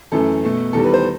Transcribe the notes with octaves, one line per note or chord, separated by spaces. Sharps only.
F#2 E3 A3 A4
B2 A3
E2 D#3 G3 A4
B4
C5